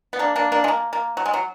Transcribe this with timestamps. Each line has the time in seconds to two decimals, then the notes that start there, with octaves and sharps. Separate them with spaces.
0.13 B3
0.19 A#3 D4
0.36 A#3 D4
0.52 A#3 D4
0.64 G#3
0.68 A#3
0.93 A#3
1.17 F#3
1.26 G#3
1.34 F#3